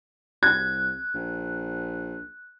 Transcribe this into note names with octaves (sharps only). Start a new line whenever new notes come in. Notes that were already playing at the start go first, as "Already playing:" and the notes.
C2 F#6 G#6
A#1